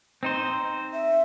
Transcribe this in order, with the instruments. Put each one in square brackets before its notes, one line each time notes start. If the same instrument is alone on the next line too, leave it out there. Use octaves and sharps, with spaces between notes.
[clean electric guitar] C4 D#4 C5
[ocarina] E5